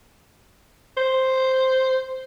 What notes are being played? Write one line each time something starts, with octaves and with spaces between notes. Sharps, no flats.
C5